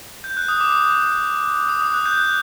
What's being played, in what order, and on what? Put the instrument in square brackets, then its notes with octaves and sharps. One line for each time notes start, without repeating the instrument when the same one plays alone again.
[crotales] G6
F#6
D#6
D6
D#6
D#6
D#6
F#6
G6
F#6